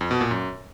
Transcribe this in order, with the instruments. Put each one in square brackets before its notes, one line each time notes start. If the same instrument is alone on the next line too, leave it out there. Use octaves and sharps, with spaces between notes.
[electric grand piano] F2
B2
A#2
F#2